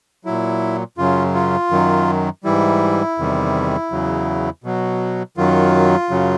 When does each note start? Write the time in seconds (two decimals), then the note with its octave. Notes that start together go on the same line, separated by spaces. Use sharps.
0.25 A#2 F#3 E4
0.98 F#2 C#3 F#3 F4
1.34 F4
1.71 F#2 D#3 F#3
2.44 G#2 E3 G3 E4
3.18 E2 C3 D#3 G3
3.91 E2 C#3 F#3
4.64 B2 F#3
5.37 F#2 D#3 F#3 F4
6.10 F#2 C#3 F#3